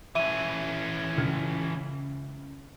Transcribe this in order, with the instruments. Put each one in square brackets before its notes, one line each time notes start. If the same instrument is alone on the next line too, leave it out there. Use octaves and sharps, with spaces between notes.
[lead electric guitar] E3 C#4 [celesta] E5 D#7
[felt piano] C#2 F6 G#6